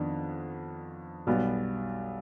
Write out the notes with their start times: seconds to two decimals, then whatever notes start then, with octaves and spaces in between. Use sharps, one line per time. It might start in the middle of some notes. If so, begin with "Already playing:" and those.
Already playing: F2 D#3 B3 D4
1.27 B1 B2 G3 B3